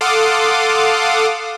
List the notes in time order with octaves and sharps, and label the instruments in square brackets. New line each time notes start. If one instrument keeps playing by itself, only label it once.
[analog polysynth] A4 F5 F#5 C6 D6 D#6